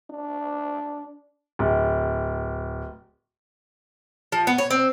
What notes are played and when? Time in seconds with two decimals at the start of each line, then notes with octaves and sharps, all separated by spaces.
0.11 D4
1.59 D1
4.32 F3
4.47 B3
4.58 C#5
4.71 C4